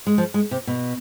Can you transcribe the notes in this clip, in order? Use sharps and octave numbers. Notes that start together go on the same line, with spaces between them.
G#3
F3
G#3
C3
B2